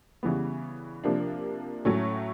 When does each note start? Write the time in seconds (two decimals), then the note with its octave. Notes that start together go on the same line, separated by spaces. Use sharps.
0.23 C#3 E3 G3 B3
1.04 C3 F3 A#3 D4
1.85 A2 F#3 A3 C#4